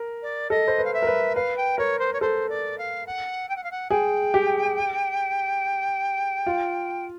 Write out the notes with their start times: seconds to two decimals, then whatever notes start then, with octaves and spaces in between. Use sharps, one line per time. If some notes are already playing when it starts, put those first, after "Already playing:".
Already playing: A#4
0.22 D5
0.50 A4 D#5
0.68 C5
0.78 B4
0.84 F5
0.94 E5
1.02 A#4
1.07 B4
1.35 B4 F5
1.57 G5
1.78 A#4 C#5
1.99 C5
2.13 C#5
2.21 A4 C5
2.49 D5
2.78 F5
3.06 F#5
3.49 G5
3.56 F#5
3.64 F5
3.71 F#5
3.90 G#4 G5
4.34 G4
6.46 F4